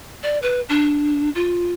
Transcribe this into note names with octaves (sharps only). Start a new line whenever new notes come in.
D5
B4
D4
F4